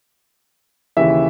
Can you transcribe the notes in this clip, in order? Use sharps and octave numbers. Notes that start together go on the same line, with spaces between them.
D#2 C#3 E3 E5